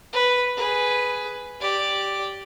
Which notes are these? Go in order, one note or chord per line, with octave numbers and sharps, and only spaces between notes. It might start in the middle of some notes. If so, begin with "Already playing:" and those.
B4
G#4 B4
G4 D5